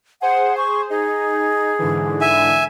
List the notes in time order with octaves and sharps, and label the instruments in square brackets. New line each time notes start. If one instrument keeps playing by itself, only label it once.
[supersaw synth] G#4 C5 [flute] F#5
[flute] C#6
[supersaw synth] D#4 [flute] G#4
[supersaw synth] G#2 D3 E3
[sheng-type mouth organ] E5 G#5